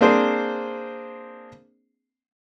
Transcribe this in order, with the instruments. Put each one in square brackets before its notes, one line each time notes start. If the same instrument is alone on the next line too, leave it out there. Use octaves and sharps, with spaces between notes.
[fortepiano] A#3 C4 D4 G#4 C5